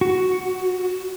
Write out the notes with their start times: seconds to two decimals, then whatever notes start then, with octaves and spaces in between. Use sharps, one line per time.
0.01 F#4